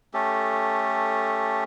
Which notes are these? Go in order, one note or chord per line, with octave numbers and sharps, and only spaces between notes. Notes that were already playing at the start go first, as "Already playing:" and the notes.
A3 C#4 G4 A4